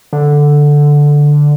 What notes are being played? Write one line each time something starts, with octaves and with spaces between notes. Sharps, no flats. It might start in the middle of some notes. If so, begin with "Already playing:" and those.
D3